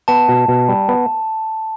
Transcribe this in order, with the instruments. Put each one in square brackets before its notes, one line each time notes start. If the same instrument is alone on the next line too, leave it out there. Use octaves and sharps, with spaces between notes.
[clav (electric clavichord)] B3 [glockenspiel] A5
[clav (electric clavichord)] B2
B2
G3
B3